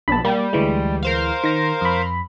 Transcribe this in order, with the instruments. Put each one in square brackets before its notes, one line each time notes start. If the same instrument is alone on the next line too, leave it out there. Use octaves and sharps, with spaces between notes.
[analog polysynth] B1 [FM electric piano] A5 B5
[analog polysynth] G3 [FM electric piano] A#3
[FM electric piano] D2 E3 G#3
[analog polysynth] A#4 C5 F5
[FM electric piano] D#3 A#6
F2 B5